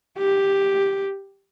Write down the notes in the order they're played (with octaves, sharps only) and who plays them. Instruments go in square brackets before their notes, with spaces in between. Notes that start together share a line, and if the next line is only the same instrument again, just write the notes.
[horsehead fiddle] G4